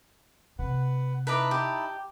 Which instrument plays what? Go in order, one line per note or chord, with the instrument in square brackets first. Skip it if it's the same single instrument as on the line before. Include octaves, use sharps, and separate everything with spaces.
[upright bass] C3 [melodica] B4 F#5
[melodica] D#4 E4 A5 [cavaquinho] B4 A#5 D6
[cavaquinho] G4